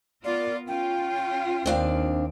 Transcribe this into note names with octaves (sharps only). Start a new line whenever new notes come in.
B3 F4 A#4 D5
C#4 F4 G5
D#2 C4 D4 F5